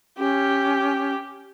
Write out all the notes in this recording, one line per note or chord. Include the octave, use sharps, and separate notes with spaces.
C#4 G4